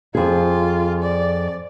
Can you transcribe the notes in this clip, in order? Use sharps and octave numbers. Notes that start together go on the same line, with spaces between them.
F2 F4 G#4
D5